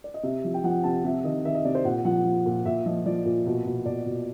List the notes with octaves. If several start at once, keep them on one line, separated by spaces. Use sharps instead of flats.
D5
D#5
C3 E5
F3
G5
F3 F#5
C3 A5
C3 E5
D#3 D#5
D#3 E5
D#5
C3 D5
C5
A#2 F#5
F3 F#5
F3
A#2
A#2 E5
F3 D#5
F3 D5
A#2
B2
B2
B2 D5
B2